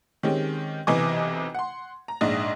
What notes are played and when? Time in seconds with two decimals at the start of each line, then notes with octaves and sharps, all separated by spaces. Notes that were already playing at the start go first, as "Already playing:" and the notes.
0.23 D#3 G#3 C4 C#4 G4
0.87 B1 C3 E3 D#5 G#5 D6
1.55 F#5 C6
2.08 A#5
2.21 A#1 G#2 D4 D#5 A#6